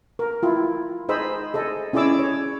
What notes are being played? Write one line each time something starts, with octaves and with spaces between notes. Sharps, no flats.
A#4
E4 F4
D#4 G#4 C5 D#5 B5 E6
G#4 A4 D#5
C#4 E4 G#4 D5 D6 E6
C#5